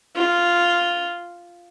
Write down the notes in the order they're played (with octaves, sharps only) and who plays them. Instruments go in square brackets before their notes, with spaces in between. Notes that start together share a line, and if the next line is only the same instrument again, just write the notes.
[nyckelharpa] F4